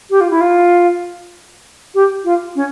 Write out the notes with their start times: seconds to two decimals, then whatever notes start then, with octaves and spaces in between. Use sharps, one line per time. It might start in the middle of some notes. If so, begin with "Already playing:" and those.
0.10 G4
0.20 F4
0.30 E4
0.40 F4
1.94 G4
2.24 F4
2.55 C#4